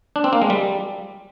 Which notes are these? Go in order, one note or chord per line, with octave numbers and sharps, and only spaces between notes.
D4
C4
A#3
G#3
G3